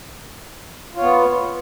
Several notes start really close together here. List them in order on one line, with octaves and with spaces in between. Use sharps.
F4 C#5 B3